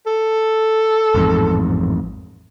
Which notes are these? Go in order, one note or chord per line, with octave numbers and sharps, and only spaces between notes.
A4
A1 F2 G#2